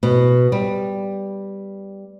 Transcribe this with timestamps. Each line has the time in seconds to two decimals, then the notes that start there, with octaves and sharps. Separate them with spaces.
0.03 B2
0.52 G3